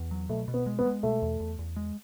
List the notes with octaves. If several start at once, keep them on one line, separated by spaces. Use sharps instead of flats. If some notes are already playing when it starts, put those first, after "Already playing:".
Already playing: E2
F#3
B2 A3
B2
B3
G#3
B3
G#3
B2 A3
E2
E2
E2
G#3